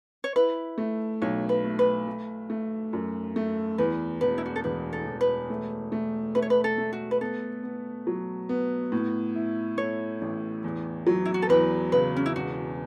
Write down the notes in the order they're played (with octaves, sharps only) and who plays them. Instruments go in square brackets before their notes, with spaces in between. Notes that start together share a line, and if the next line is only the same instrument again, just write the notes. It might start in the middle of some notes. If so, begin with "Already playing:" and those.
[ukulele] C#5
[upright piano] E4 [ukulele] B4
[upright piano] A3
[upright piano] B1 [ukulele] C#5
[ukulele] B4
[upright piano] A3
[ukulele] B4
[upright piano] A3
A3
F#2
A3
[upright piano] E2 [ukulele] B4
[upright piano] E1 [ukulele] B4
[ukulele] E4
F#4
A4
[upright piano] E1 [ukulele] B4
[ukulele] A4
[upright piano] E1
[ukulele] B4
[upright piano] A3
A3
[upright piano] A3 [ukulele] B4
[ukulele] C#5
B4
A4
[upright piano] A3
[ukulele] F#4
B4
[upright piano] B3 [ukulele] A4
[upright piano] B3
F#3
B3
A2
E4
[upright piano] A3 [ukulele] C#5
[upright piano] A1
E2
F#3
[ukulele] E4
F#4
A4
[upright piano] E2 [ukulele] B4
[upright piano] C#3 [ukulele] B4
[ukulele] C#4
E4
[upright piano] E1 [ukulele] F#4